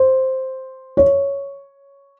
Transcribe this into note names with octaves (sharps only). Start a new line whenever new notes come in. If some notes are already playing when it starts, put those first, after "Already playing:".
Already playing: C5
C#5